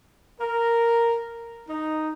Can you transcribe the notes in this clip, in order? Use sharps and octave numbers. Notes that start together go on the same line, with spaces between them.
A#4
D#4